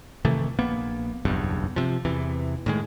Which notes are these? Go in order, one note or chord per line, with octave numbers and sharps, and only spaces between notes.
C3 D#3 E3 A3
A#1 A#3 B3
F#1 B1 E2 G2
C3 F3
E2 C3 E3
A2 D#3 G#3